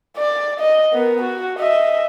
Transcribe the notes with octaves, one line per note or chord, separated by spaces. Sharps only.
D5
D#5
B3 A#4
F#4
D#5 E5